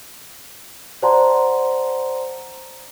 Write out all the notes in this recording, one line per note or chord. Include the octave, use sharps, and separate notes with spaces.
C5 D5 F#5 A5 A#5 C6